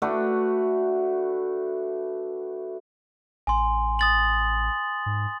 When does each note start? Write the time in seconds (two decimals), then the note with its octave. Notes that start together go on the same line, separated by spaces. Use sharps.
0.02 A3 D4 F#4 B4
3.47 A1 G#5 C6
3.99 D#6 A6 F#7
5.06 G#2